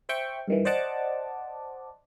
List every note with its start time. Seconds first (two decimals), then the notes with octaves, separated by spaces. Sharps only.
0.09 C5 E5 G5 C#6
0.48 G2 D#3 E3
0.65 C5 D5 D#5 F#5 A5 D6